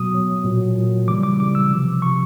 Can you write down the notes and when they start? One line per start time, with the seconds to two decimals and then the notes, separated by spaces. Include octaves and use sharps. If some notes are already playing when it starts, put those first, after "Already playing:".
Already playing: B2 F#3 D#6
0.13 B2 F#3
0.44 A#2 F#3
0.76 A#2 F#3
1.08 C#3 E3 G3 D6
1.23 D6
1.40 C#3 E3 G3 D6
1.55 E6
1.71 C3 F3
2.02 C3 F3 C#6